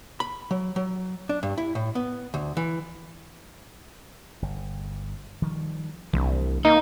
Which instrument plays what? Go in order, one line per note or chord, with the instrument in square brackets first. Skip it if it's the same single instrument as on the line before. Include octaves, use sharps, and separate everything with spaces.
[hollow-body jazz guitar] B5
F#3
F#3
D4
G2
E4
A2
B3
D2
E3
[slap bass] G1
D#3 F3 G3
[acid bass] C2 [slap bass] E3 A3 D4
[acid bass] A#3 [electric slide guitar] D#4